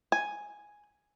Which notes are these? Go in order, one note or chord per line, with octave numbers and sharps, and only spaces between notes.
G#5